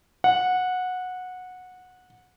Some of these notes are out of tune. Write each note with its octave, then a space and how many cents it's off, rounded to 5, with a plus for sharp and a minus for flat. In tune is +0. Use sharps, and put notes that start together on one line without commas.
F#5 -15